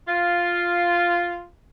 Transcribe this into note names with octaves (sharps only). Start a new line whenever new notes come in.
F4 F5